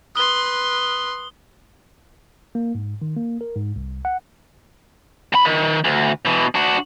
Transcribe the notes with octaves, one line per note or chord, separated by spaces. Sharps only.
B4 C6 D#6 G7
A#3
G#2
D#3
A#3
A#4
G#2
C2
F#5
C2 B5
D#3
D2
B2 E3
D4 F#4